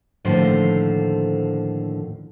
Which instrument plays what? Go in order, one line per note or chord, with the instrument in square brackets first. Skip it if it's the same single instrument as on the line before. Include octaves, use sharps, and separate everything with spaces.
[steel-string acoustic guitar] D#2 A2 D3 F3 C5